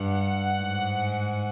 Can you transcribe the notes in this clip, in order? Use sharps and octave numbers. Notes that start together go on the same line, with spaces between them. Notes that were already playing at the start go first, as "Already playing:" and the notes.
Already playing: G2 F#5
G#2